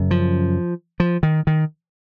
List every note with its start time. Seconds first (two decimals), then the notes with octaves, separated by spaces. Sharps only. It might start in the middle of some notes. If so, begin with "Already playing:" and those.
Already playing: F#2 C#3
0.11 F3
1.00 F3
1.23 D#3
1.47 D#3